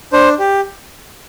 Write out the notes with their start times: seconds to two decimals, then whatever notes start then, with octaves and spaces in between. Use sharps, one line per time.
0.13 D4 C5
0.39 G4